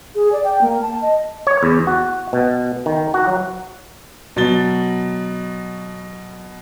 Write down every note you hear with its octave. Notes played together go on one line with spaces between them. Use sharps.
G#4
D5
G5
A#3
A5
D#5
C#5
E2
F#4
B2
D#3
F#4
F#3
B2 F#3 A6 G7